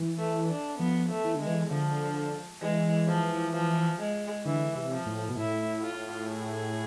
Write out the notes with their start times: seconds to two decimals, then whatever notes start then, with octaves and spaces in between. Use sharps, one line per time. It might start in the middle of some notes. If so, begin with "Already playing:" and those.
Already playing: E3
0.18 A3
0.48 D4
0.79 F3 B3
1.09 A3
1.24 E3
1.35 D3 G#3
1.47 E3
1.71 D3 F3
2.62 E3 G#3
3.08 F3
3.54 F3
4.00 G#3
4.45 D3 E3
4.76 C3
4.91 F3
5.06 A2
5.29 B2
5.36 A2 E4
5.82 F4
6.28 G#4